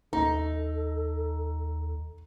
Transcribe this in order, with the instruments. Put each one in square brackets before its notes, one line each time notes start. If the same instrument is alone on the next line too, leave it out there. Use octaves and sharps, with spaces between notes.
[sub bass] D#2 [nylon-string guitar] D#4 [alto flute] A4 [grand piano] A#5